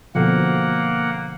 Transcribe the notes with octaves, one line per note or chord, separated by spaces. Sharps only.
B2 D3 F3 A#3 F#5